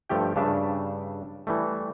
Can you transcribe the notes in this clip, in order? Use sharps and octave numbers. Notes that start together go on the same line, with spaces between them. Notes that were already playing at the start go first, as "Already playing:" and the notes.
G2 F3 A3 G4 G5
G2 C#3 D4 E5 A5
E3 G3 A3